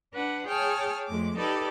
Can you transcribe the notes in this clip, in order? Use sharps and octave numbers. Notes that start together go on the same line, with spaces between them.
D4 B4 F#5
G#4 C#5 G5 A5 F6
F2 G#3 A3 D6
D#4 G4 A4 B4 D5